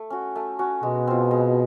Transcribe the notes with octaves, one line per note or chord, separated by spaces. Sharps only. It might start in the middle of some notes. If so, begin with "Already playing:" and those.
Already playing: A3
C#4 F#4
A3
C#4 F#4
B2 G#3
C4 F4
G#3